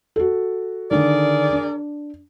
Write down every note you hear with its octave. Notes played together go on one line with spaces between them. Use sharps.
F#4 A4
D3 D#3 G#4 A#4 D5
D4